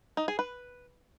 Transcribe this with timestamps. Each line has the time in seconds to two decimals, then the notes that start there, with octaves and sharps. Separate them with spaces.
0.17 D#4
0.28 G#4
0.39 B4